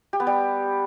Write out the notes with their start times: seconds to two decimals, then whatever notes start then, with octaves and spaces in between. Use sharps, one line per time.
0.13 G4
0.20 B3
0.27 G3